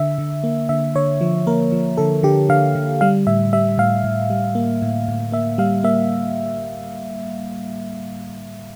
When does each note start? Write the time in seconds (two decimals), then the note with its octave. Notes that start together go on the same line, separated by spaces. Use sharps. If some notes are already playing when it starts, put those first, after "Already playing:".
Already playing: D3 E5
0.18 D3
0.44 A#3
0.69 D3 E5
0.95 D3 C#5
1.21 F3
1.47 A#3 A#4
1.72 F3
1.97 D3 A4
2.23 D3 G4
2.49 D3 F5
2.75 D3
3.01 G3 F5
3.27 A2 E5
3.53 G3 E5
3.78 A2 F5
4.04 A2
4.30 G3
4.55 A#3
4.82 A2
5.08 A2
5.32 A#3 E5
5.58 G3 F5
5.84 A#3 E5